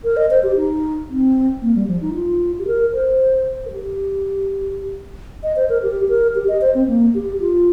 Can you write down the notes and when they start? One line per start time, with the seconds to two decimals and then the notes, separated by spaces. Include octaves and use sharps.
0.04 A#4
0.17 D#5
0.31 C5
0.43 G4
0.57 D#4
1.09 C4
1.62 A#3
1.75 G3
1.88 F3
2.01 D#4
2.15 F4
2.59 G4
2.67 A#4
2.93 C5
3.66 A#4
3.72 G4
5.43 D#5
5.56 C5
5.69 A#4
5.83 G4
6.09 A#4
6.35 G4
6.48 D#5
6.61 C5
6.75 C4
6.88 A#3
7.15 G4
7.40 F4